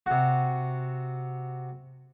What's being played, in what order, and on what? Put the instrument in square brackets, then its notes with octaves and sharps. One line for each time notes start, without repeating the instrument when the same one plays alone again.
[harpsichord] C3 F#4